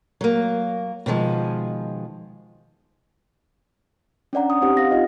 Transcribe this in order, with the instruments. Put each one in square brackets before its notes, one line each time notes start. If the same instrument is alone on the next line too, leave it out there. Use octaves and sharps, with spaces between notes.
[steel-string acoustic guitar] F#3 A#3
B2 D#3 F3 G#3
[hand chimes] C#4 D4 D5 F#5 A#5
D#6
C4 D#4 G4 C5 F#5
F5 A#6
D#4 F4 C5 D#5